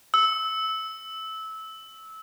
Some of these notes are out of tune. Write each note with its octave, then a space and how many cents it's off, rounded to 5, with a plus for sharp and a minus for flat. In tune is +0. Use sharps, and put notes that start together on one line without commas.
E6 -20